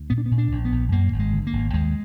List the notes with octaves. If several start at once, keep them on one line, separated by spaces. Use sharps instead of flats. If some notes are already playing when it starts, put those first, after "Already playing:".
Already playing: D2
A#2 B3
D4
B3
A#2
D4
A#1
B3
A#1
F#2 A#3
G#1
G#3
D3
A#3
G#1
D#2 G#3